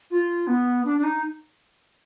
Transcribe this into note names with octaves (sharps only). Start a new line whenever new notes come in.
F4
B3
D4
D4
D#4